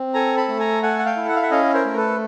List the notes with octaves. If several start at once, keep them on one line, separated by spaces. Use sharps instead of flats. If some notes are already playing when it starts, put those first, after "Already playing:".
Already playing: C4
A4 G#5 A#5
A5 B5
A3
G#5 A#5
A4 F#5 G#5
F#5
F5 G5
E4
F#5
F5
E5 F#5
C#4 D#5 F5
A#4 C5
A3 A#4
A4 B4